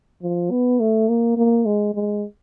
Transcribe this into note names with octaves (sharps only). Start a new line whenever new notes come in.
F3
B3
A3
A#3
A#3
G#3
G#3